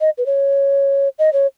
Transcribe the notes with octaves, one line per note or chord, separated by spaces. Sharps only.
D#5
B4
C#5
D#5
C#5